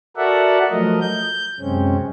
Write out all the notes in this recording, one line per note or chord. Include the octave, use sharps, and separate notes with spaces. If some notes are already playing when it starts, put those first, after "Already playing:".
F#4 A4 A#4 D5 E5 F#5
F3 F#3 A3 A#4 D#5
G6
F#2 C3 G#3 C4 C#4